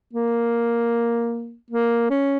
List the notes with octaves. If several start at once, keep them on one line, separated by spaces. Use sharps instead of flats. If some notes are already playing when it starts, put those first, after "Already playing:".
A#3
A#3
C#4